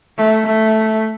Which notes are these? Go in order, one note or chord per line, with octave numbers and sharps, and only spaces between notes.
A3
A3